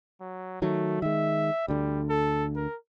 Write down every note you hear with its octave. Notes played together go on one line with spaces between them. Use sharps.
F#3
D#3 F#3 A3
D#3 G#3 E5
D2 D3 G3
A4
A#4